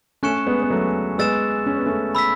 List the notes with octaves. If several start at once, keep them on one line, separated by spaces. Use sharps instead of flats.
A3 C#4 G#5 C#6 F#6 C#7 E7
G#3 B3
B3
F#3 A3
G#3 B3 E6 A6 E7
C#4
B3
A3 C#4
B5 E6 B6